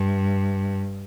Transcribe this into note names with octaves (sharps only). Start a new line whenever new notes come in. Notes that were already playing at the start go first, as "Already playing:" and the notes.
Already playing: G2